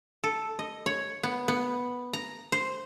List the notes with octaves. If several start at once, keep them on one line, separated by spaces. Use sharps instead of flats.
A4
D#5
C#5
B3
B3
A#5
C5